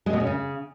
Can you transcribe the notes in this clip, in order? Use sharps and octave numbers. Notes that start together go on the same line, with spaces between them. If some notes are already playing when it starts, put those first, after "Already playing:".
G#3
B2
C#4
C#3